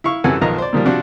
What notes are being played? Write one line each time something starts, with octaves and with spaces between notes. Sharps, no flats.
E4 F5 C#6
F#2 C3 E3 A4 F#5 G#5
B1 D#3 F3 B3 D#5 A#5
C5 D5
A#2 D#3 F3 G3
C3 F3 D4 F#4